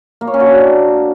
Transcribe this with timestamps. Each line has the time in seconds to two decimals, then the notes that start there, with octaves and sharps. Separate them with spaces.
0.21 A#3
0.27 C#5
0.34 C#4
0.40 F#4
0.46 D4